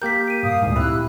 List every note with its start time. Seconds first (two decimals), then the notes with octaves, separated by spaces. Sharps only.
0.02 A#3 G4 A#4 G6 B6
0.28 D7 D#7
0.43 G2 A#2 F5 D#6
0.63 D2 G#2
0.76 C4 E4 G4 B5 E6 F#6